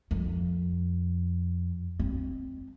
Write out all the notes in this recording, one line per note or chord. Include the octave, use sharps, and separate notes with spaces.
F2
C4